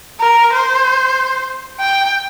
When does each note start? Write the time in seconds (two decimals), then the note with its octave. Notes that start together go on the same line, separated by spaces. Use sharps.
0.21 A#4
0.54 C5
1.80 G5